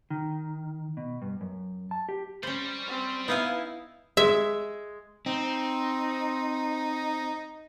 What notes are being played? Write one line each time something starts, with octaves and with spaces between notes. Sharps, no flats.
D#3
B2
G2
F#2
A5
G4
G3 C#4 C5 B5
C4
B3 D#4 E4 F5 G#5
G#3 E5
C4 D#4